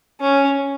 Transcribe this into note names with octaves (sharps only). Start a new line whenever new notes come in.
C#4